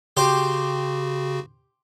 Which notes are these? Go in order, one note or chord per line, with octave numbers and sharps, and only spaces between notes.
C#3 F#4 G4 C5